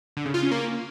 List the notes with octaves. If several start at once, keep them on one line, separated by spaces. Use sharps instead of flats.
D3
C#3
F4
C#4
A#3